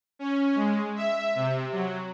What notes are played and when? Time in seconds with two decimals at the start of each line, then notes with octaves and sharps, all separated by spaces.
0.19 C#4
0.55 G#3
0.96 E5
1.35 C3
1.72 F#3